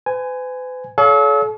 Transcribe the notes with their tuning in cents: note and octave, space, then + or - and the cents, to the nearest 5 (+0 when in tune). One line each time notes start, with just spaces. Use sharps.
B4 +45 G#5 +0
A4 -40 C#5 +35 F5 +0